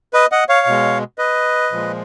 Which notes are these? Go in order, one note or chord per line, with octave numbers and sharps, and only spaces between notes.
B4 D#5
D#5 F#5
C#5 F5
B2 G#3
B4 D#5
A#2 F3 G#3